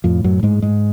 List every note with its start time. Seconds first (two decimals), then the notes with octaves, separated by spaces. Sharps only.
0.04 F2 A2 F3
0.24 F#2 F#3
0.43 G#2 G#3
0.62 G#2 G#3